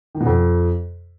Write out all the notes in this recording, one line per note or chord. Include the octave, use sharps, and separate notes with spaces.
D#3
B2
F2